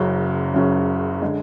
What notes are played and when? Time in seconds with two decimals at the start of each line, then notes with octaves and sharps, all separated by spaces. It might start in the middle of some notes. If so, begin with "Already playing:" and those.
Already playing: F#1 F#2 C#3 F#3
0.54 F#1 F#2 C#3 F#3
1.22 D3 G#3